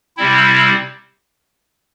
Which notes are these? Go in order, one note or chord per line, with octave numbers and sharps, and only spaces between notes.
C3 G3 C4 E4